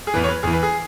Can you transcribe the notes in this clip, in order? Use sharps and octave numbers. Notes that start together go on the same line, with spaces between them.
G#4
E2 E3 B4
C#5
B4
E2 E3 G#4
B4
G#4